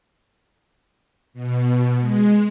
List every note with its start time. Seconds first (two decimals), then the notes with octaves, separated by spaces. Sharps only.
1.34 B2
1.99 G#3